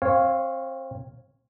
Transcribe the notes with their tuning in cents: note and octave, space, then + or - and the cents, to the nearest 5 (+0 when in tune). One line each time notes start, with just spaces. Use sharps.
C4 +25 C#5 -5 F5 +0